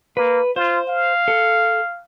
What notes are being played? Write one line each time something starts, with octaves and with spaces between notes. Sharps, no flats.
A#3 B4
F4 C5
F5
A4